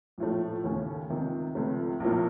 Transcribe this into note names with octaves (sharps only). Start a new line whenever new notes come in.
A#1 A2 F3 A3
D#2 C#3 A3 C#4
C#2 C3 D#3
C#2 C3 F3 A3
A#1 A2 F3 A#3